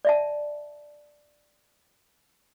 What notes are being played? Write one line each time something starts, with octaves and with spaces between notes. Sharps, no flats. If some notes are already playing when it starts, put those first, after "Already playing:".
D5 E5 A5